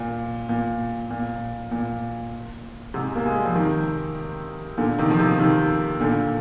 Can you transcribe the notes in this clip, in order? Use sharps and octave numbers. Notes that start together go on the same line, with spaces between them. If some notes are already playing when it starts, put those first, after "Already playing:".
Already playing: A#2
A#2
A#2
A#2
G#2 C3
A#3
G#3
G3
F3
C3 D#3
A#2 D3
C3 D#3
F3
C3 D#3
C3 D#3
A#2 D3